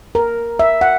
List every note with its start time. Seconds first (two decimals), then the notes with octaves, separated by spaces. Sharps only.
0.15 A#4
0.59 E5
0.81 F#5